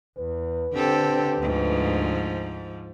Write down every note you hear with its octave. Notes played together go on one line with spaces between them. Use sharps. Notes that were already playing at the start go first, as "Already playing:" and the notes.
E2 B4
D3 C4 G4 A4
D2 G#2 F3